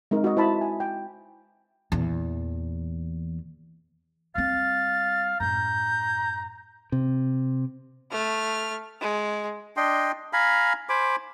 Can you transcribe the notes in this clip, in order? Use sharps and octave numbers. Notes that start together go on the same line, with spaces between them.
G#3 C4 D#4 A#4
F#4 D#5
E4 C5 E5 A5 B5
G#5
G5
E2 A#2
G3 C4 F5 A6
F#2 A2 A#5 G6
C3
A3 F6
G#3
D4 D#5 G5 C6
F5 G#5 A#5 B5
C5 G#5 B5 D6